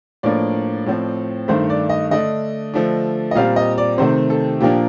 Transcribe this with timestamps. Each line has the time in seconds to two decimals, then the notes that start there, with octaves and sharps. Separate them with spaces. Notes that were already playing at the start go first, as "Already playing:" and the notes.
0.23 A2 F3 A#3 D4 D5
0.86 A2 F3 C4
1.48 G2 D#3 A3 C5
1.70 D5
1.89 D#5
2.11 D3 A3 D4 D#5
2.74 D3 F3 A3 D4
3.31 D#5
3.35 A#2 G3 C4 F5
3.56 D#5
3.78 D5
3.98 C3 D#3 A3 C4 C5
4.30 A4
4.61 A#2 F3 A#3 D4 G4